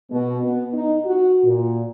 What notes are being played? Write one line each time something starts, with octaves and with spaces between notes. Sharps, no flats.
B2
B3
D#4
F#4
A#2